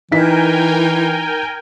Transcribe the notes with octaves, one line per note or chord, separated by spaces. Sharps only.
E3 D#4 A#4 G5 G#5 B6